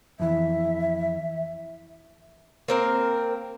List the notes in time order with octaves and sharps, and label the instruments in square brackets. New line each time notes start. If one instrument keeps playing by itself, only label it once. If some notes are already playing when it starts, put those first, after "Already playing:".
[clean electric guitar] F2 E3 [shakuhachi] E5
[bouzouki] A#3 C4 A#4